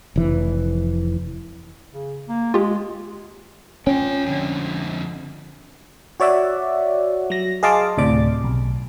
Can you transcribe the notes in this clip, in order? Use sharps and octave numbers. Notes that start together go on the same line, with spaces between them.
F1 E3
C#3
A#3
G#3 F4 G4
C#4 F4 G5
F2 D3
F#4 C#5 D5 E5 F#5
F#3 A#6
G#4 D#5 F5 A5 C6 D6
D2 A2 C3 D5 D6
B1